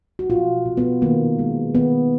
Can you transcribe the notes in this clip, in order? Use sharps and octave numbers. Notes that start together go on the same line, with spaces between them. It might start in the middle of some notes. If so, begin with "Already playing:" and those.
F#4
B2 F4
B2
B3
D#3 A#3
G#3
D#3 B3